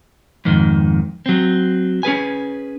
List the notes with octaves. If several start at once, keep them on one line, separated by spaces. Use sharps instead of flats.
F2 G#2 D#3
F#3 C4
C#4 G#4 B4 G#5